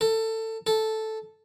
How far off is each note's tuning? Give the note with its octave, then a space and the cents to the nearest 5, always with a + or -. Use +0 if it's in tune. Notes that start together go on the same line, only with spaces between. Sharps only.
A4 +20
A4 -5